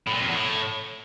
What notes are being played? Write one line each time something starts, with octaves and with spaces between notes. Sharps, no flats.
A2
A#2
F2
E2
A2